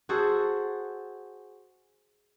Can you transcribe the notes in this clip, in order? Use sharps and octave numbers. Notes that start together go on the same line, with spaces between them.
F#4 G#4 A4 C5